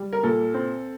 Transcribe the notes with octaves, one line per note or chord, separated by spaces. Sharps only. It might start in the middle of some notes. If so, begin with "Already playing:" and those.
Already playing: G3
A#4
A#2 A4
C4